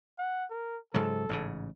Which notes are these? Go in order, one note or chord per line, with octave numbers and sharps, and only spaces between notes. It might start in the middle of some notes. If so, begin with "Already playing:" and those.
F#5
A#4
G#2 C#3 F#3 A4
A1 G#2 C#3